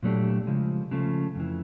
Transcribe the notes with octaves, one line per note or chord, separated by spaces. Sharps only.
A#2 F#3 A3 D4 G4
C#3 F3 G#3
C#3 F3 A3
F2 C#3 E3